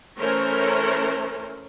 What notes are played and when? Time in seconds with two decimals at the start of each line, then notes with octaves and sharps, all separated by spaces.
0.18 E3 A3 C#4 A#4 C5 C#5